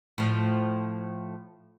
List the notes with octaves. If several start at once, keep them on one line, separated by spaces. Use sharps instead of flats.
A2 F3